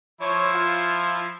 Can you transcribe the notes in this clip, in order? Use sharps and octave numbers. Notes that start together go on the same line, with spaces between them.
F3 E4 C#5
F4